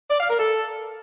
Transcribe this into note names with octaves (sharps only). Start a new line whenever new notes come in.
D5
F5
A#4
A4